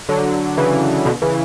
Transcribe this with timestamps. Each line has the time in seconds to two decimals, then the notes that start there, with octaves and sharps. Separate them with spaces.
0.09 D3 F#3
0.57 C#3 E3
1.05 B2 D3
1.22 C#3 E3